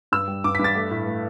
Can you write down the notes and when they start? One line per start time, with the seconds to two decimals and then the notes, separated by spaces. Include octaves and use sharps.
0.12 G2 E6
0.28 G3
0.44 G2 D6
0.55 B6
0.59 G2 A6
0.75 A3
0.91 A2
1.07 A3